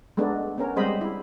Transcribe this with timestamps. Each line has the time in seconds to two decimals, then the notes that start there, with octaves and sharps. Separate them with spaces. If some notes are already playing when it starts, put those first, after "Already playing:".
0.17 G#3 A3 B3 D4 D#4
0.58 B3 C#4 A#4
0.76 G3 G#3 C4 C5 D#5 B5
1.01 E4